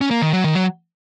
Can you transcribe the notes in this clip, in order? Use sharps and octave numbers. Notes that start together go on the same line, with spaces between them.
C#4
A#3
D#3
F#3
D#3
F#3